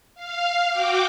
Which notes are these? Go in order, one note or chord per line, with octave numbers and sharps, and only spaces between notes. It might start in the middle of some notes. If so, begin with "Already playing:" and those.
F5
F#4 G5 D6